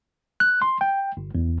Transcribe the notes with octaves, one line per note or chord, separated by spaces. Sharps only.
F#6
C6
G5
G1
E2